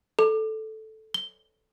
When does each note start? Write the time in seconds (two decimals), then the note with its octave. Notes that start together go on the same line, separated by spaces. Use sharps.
0.19 A4
1.14 G7